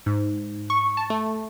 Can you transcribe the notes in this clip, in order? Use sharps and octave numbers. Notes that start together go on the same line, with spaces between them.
G#2
C#6
A5
A3